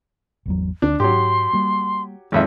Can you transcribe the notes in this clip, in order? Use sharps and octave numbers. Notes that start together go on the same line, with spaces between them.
G#1 E2 F#3
D2 D4
G#2 F#3 G4 C6
G3 A#3
G#1 F2 E5